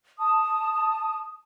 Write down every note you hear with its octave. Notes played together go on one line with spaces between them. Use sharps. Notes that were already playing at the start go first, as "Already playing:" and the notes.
A5 D#6